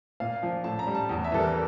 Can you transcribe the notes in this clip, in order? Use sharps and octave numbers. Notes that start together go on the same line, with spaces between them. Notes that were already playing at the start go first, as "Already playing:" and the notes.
A#2 F5
F3
A2 A5
A#5
G3
A5
E2
E5
E3 G3 A4
A#4